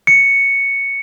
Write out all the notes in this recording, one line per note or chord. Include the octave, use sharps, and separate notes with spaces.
C#7